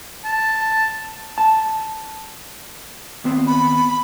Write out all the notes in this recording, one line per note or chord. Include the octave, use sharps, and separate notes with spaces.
A5
A5
D#2 B3 C4
B5